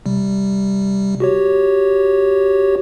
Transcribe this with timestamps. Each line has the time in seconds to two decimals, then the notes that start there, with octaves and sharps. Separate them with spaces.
0.06 C3 G3
1.20 F#4 G4 C#5